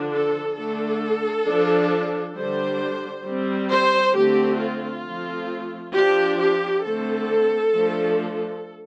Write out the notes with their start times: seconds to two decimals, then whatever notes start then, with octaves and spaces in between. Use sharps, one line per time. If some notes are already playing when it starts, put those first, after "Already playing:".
Already playing: D3 F3 D4
0.12 A4
0.57 D3 A3 D4 A4
1.46 F3 D4
2.36 D3 G3 D4 C5
3.26 G3 C4
3.70 C5
4.15 D3 A3 C4 G4
4.60 F4
5.05 F3 A3 C4
5.95 F3 D4 G4
6.39 G4
6.84 D3 A3 C4 A4
7.74 F3 A3 D4